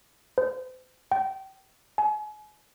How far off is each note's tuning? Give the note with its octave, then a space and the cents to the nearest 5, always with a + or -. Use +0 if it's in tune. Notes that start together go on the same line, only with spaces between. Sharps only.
C5 -40
G5 -30
G#5 +35